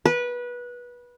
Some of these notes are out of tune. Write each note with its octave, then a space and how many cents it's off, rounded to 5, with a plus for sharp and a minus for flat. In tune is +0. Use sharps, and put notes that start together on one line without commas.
B4 -20